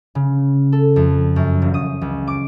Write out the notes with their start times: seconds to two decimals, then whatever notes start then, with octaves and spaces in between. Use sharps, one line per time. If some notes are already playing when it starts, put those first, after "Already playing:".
0.15 C#3
0.72 A4
0.96 F2
1.36 F#2
1.62 E1
1.74 D#6
2.02 C#2
2.28 D6